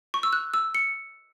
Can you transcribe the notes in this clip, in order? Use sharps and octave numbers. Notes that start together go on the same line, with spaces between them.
C#6
E6
F#6
E6
C#7